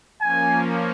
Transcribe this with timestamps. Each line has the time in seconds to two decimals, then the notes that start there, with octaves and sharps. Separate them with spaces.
0.22 F3 A#3 C#4 G#5